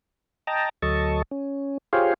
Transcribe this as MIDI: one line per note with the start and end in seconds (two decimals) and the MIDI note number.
0.47 0.69 75
0.47 0.69 79
0.47 0.69 81
0.47 0.69 82
0.82 1.22 38
0.82 1.22 54
0.82 1.22 69
0.82 1.22 75
0.82 1.22 81
0.82 1.22 85
1.31 1.78 61
1.93 2.14 65
1.93 2.14 67
1.93 2.14 68
1.93 2.14 72
1.93 2.14 73
1.93 2.14 77